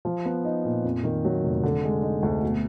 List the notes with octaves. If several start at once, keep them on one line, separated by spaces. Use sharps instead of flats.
F3
B3
D#4
A#2
F2
D#3
F#3
F1
D3
G#3
D#4
D2
B2